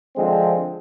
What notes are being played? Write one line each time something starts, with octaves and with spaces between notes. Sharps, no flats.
D3 F3 G#3 C4